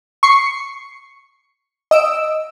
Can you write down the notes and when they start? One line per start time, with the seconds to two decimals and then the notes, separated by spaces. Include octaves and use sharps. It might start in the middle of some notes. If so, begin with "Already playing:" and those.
0.23 C#6 C7 C#7
1.91 D#5 E6 D7